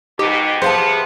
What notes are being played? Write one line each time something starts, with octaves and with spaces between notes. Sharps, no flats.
G#2 B2 D#4 G4
E3 B3 G#4 C5 F5 A5